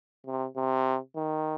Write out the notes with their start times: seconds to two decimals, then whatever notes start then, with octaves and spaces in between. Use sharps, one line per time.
0.26 C3
0.56 C3
1.16 D#3